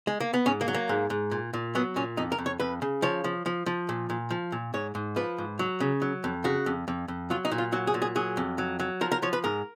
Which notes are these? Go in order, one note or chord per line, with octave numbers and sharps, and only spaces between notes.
G#3
A#3
B3
G#2 C#4
A#3
F#3
A#3
G#2
G#2
A#2
A#2
F#3 B3
A#2 C#4
F2 D#4
A#4
F2
C#5
F2 B4
C#3
F3 C#5
F3
F3
F3
A#2
A#2
F3
A#2
G#2 C#5
G#2
F3 B4
G#2
F#3
C#3
F#3
F2
C#3 F#4
F2
F2
F2
F#3 F4
D#4
A#2
F4
F#3 F#4
G#4
A#2
G#4
F#3 G#4
F2
F#3
F#3
F3 A#4
A#4
F3 C#5
B4
G#2 A#4